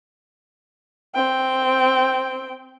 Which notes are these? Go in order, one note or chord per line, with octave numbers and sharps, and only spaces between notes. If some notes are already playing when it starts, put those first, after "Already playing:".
C4 G5